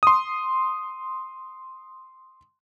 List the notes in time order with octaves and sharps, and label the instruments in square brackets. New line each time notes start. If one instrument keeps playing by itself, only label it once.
[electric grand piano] C6 D#6